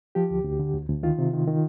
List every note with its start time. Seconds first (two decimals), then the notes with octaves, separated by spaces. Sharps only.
0.15 F3 G4
0.31 D2
0.44 D2
0.59 D3
0.74 D2
0.89 D2
1.03 D#3 F4
1.18 C3
1.34 D#3
1.47 D#3